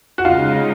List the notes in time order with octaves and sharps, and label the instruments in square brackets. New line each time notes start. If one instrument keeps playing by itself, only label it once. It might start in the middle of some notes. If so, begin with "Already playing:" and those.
[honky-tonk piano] F#4
[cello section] C#3 G#3 D#4 [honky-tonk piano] F4